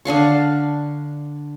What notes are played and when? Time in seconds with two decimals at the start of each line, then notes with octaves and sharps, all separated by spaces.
0.05 D3 D4 F5 C#6